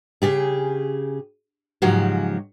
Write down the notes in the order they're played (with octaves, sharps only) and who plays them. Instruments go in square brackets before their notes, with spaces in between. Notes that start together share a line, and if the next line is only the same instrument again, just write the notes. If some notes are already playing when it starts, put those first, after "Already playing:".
[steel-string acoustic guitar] C#3 G4 G#4
G#2 C#3 F3 F#3 F#4 G4